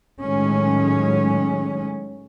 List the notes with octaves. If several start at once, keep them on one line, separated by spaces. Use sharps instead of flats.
A2 D#3 F#3 G#3 C#4